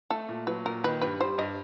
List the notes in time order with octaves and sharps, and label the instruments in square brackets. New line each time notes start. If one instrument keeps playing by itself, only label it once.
[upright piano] A3 [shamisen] A4
[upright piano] A#2
[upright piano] F#3 [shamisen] B4
[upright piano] A#2 [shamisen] A#4
[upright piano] D#3 [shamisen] B4
[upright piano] G2 [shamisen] B4
[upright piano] G3 [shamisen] C5
[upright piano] G2 [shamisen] D#5